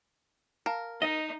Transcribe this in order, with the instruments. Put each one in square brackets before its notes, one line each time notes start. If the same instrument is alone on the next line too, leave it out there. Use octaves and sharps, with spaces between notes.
[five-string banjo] A#4 [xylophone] F5 A5
[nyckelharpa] D#4 [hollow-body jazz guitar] D#5